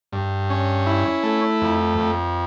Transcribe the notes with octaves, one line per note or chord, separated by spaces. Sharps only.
G2
C#4
E4
A3
F2
F2